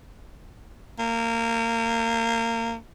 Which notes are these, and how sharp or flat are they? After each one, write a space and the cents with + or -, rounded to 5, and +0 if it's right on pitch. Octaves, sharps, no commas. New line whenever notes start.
A#3 -25